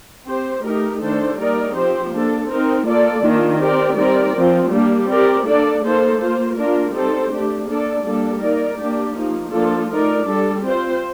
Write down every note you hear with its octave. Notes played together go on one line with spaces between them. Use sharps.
C4 G4 C5
A3 D#4 G4 A#4
D#3 A3 D4 A4 C5
G3 A#3 D#4 A#4 D5
F3 C4 G4 C5
A#3 D4 A4
C4 D#4 A#4
A#3 F4 A4 D5
D#3 A#3 D4 F4
C4 G4 A#4 D5
G3 C4 D#4 A#4 D5
F3 C4 F4
G3 A#3 D4
C4 G4 A#4 D5
A#3 D4 A4 D5
A#3 D#4 A4 C5
A#3 F4 C5
A#3 D4 F4 A#4
G3 C4 D#4 A4 C5
A3 D4 G4
A#3 D4 A4 D5
G3 A#3 D4 A4
A#3 D#4 A#4 D5
A#3 D4 G4
F3 A#3 D#4
F3 A#3 D4 F4 A4
A3 D#4 A#4 D5
G3 D4 A4
C4 F4 C5